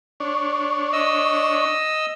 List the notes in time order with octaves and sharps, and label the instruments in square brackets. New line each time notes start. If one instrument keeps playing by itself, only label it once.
[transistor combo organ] D4 C#5
[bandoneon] D#5 E6